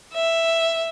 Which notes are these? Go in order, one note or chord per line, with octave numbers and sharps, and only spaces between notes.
E5